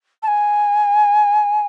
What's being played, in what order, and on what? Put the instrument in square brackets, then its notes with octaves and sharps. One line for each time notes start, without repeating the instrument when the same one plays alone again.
[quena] A5
G#5